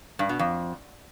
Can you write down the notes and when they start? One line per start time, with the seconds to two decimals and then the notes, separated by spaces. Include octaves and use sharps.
0.19 G2
0.29 B2
0.39 F2